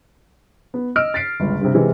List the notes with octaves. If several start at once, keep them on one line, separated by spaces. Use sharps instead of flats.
B3
D#5 E6 F6 D7
A6 B6 C7 D7
G1 C#2
G2 C3
C3 E3 G#3